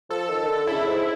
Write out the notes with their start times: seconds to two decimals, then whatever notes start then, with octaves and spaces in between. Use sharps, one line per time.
0.10 F3 A4
0.29 D#3
0.42 D#3
0.48 D3
0.67 C#3 E4
0.87 G#2